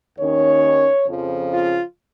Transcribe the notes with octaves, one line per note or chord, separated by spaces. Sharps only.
D#2 D#3 C#4 C#5
F2 C#3 F3
F4